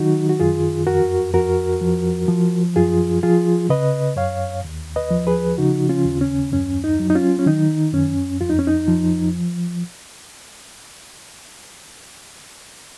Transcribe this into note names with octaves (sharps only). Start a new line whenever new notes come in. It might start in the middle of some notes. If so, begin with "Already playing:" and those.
Already playing: D#3 F#3 D#4 F#4
F#4
F#2 F4 G#4
F2 F#4 A#4
F2 F#4 A#4
F3
F3
F#2 F4 G#4
F3 F4 G#4
C#3 B4 D#5
F#2 C#5 F5
D#2
B4 D#5
F3
G#4 B4
C#3 D#4 F#4
C#4 F4
D#2
C#4
F#2 C#4
D#4
F#3
D#4
C#4 F4
C#4
D#3 D#4
F#2 C#4
F2 F4
D#4
C#4
D#4
F3